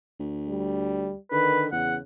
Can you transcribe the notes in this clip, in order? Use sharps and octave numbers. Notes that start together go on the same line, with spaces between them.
D2
G3
D3 D#3 B4
E2 C#3 F#5